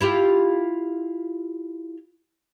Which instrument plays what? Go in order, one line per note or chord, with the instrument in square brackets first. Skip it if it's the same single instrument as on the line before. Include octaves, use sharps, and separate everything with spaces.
[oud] E4 F4 G4